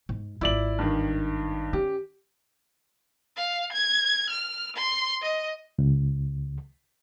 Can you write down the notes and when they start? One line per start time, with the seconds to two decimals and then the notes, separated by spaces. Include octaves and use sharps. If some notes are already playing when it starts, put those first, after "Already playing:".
0.09 G#2
0.41 G#1 E4 F4 D5 F#7
0.79 G2 D#3
1.73 C#4 G4
3.37 F5
3.72 G#6
4.30 F6
4.76 C6
5.22 D#5
5.79 C#2